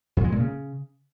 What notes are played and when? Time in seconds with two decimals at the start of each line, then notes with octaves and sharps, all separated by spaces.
0.17 F2
0.24 G#3
0.32 A#2
0.40 C#3